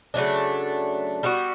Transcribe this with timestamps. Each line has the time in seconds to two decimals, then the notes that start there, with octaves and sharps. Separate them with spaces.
0.14 C#3 F#3 A3 D4
1.23 G3 B3 F#4